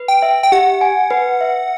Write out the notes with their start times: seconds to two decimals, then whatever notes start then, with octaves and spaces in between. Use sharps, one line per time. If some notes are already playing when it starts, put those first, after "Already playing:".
Already playing: B4
0.08 G5
0.22 E5
0.43 G5
0.52 G4 F#5
0.81 G#5
1.10 B4
1.41 E5